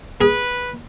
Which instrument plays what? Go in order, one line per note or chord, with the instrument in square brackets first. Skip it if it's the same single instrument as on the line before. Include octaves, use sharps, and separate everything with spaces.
[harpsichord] G#4 [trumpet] B4